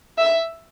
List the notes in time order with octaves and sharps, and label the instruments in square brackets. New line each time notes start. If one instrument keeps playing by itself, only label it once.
[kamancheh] E5